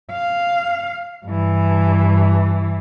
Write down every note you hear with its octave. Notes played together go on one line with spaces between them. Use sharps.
F5
G2 E3